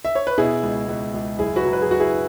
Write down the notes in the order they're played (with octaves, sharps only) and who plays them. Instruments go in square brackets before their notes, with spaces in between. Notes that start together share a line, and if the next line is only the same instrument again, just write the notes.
[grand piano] E5
C#5
B4
B2 E4 G#4
C#2
C#2
C#2
F#1 E4 G#4
F#4 B4
F#3
B4
G#4
F#1 F#4
E4 G#4